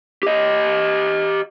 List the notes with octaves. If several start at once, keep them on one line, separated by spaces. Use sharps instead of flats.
G4 D#5